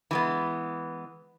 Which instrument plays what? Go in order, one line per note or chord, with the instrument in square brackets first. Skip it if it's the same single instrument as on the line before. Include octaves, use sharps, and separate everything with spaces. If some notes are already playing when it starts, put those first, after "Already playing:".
[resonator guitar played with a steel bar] E3 G#3 B3